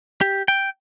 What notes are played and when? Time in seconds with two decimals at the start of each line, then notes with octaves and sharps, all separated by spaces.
0.21 G4
0.48 G5